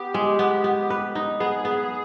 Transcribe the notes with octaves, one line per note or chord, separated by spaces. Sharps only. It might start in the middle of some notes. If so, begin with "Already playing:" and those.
Already playing: B3 G4
G#3
B3
B3
B4
D#4
B3 G#4
B3